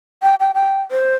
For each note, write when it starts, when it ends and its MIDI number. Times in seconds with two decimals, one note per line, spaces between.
0.22 0.35 79
0.40 0.52 79
0.54 0.81 79
0.91 1.16 72